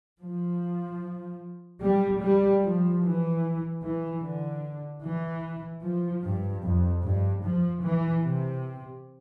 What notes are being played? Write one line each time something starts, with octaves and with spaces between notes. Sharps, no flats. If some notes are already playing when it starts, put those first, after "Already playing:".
F3
G3
G3
F3
E3
E3
D3
E3
F3
G2
F2
G2
F3
E3
C3